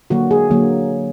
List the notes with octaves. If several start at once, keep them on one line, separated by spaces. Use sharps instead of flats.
D3 F#3 A#3 F#4
G#4
D3 F#3 A#3